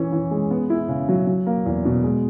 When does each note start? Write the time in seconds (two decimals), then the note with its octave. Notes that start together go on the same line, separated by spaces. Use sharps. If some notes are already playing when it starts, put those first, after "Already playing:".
Already playing: E3 C#4
0.12 E3
0.31 G#3
0.50 B3
0.70 E4
0.88 C#3
1.09 F#3
1.27 F#3
1.46 A#3
1.66 E2
1.85 B2
2.04 G#3